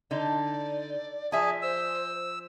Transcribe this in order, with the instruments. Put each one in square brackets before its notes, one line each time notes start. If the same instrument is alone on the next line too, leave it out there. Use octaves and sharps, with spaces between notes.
[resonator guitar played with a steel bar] D3 D#4 [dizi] D5
[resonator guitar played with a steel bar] F3 E5 G#5 [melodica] G#4
[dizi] C5 [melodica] E6